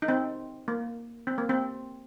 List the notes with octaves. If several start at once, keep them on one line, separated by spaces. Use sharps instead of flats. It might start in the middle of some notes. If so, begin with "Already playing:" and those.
D#4
C4
A#3
C4
A#3
C4